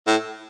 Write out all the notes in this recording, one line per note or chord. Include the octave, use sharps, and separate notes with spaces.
A2